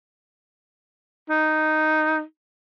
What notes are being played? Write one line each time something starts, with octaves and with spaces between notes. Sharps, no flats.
D#4